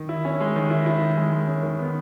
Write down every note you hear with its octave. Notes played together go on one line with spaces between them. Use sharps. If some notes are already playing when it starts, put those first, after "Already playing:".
Already playing: D#3
E4
C#4
G#3
D#3
E4
E4
D#3
G#3
G#3
C#4
D#3
B3